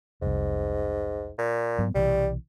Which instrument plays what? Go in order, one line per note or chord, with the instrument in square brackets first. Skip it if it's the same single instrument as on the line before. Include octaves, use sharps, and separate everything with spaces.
[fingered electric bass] F1 C2 [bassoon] G#2
[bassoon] A#2
[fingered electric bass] G#2 F#3 B3
[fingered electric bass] B1 C3 E3 [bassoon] G3